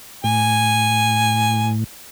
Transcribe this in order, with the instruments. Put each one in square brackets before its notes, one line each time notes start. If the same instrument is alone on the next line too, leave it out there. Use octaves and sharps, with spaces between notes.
[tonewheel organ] A2 [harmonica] G#5